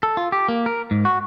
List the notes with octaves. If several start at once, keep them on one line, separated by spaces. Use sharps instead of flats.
A4
F4
G4
A#3
A#4
G#2
F#4